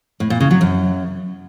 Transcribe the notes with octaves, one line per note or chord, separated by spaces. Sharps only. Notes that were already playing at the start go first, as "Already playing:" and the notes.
A2
A#2
C#3
F#3
F#2